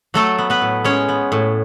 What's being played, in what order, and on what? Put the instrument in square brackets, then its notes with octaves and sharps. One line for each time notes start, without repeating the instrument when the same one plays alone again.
[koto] F#3 A3 A4
B3
B3 B4
A2
G#3 C#4 C#5
B3
A2